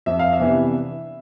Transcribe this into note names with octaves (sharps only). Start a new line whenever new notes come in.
F2 E5
F5
E5
C3 E3 B3 D4